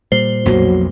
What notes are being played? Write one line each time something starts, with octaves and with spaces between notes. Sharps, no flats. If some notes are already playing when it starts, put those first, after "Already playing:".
A#2 G3 C5
B1 F2 F#3 A#3